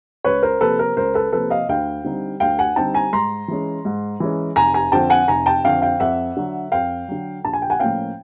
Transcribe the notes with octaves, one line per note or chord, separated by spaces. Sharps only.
C#2 B4 C#5
A#4 C5
C3 F3 A#3 A4 B4
A#4 C5
C#2 A#4 C5
A4 B4
C3 F3 A#3 A4 B4
D#5 F5
D2 F5 G5
D3 G3 C4 D#4
D2 F5 G5
F#5 G#5
D3 G3 C4 D#4 G5 A5
G#5 A#5
G#2 A#5 C6
E3 G#3 C#4
G#2
E3 G#3 C#4
F1 G#5 A#5
G#5 A#5
F2 D3 F3 G5 A5
F#5 G#5
F1 G#5 A#5
G5 A5
F2 D3 F3 F5 G5
F5 G5
F2 E5 F#5
D3 F#3
F2 F5 G5
D3 F#3
A#1 A5
G#5
G5
F#5 G#5
A2 F3 A#3 C#4 F5 G5